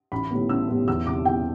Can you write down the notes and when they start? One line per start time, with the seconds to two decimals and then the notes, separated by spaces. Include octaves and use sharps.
0.12 A1 B5
0.31 A2 G3 B3
0.49 A1 E6
0.69 A2 G3 B3
0.88 E2 E6
1.07 C3 G3 D6
1.25 E2 G5